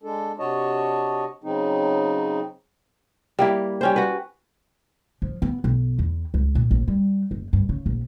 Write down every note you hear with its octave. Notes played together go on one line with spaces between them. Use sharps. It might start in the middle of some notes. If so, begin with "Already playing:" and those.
G#3 D4 A4
C3 D4 F#4 C#5 D#5 A5
C#3 F#3 C4 D#4
G3 A#3 E4
G3 C#4 C5
F#4 B4
F3
B3
B1
E2
C#2
A#2
A#1
G3
F#1
G2
C#3
A#1